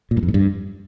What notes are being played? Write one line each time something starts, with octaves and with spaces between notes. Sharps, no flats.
A#2
G2
F2
G#2
G2